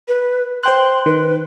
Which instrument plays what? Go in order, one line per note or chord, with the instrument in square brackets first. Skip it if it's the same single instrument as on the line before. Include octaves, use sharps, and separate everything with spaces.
[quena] B4
[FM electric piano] C5 G5 F#6 [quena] C6
[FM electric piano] D#3 [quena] B4